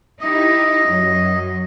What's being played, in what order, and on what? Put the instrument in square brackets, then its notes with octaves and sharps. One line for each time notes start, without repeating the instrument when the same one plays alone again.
[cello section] D#4 E4 G4 [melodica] D#5
[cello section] F#2 F#3